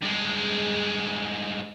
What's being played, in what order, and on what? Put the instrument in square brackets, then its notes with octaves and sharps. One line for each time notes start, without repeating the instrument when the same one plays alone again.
[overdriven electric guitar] G2 G#3